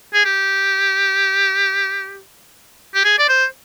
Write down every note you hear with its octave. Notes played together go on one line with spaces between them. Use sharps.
G#4
G4
G4
G#4
D5
C5